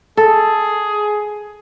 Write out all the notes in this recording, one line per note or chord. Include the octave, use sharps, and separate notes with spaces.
G#4 A4